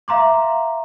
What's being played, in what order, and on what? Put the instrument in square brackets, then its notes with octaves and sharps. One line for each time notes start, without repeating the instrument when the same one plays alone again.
[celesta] E5 F5 A#5 C6 D6